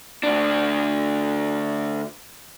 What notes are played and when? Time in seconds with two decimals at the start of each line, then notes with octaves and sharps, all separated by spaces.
0.23 D2 D4